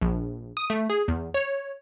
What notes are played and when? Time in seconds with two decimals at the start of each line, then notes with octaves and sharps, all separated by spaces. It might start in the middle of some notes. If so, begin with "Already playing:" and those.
0.02 A#1
0.57 D#6
0.70 A3
0.90 G#4
1.08 E2
1.34 C#5